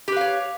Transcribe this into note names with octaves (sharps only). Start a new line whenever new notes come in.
G4 B4 C#5 F5